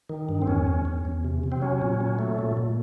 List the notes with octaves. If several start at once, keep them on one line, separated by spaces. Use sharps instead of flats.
D#3
G2
C4
E2 C#4
E2
E2
E2
C3
C3
C4
F#3 C#4
A#2
F#3
A3
A#2
A#2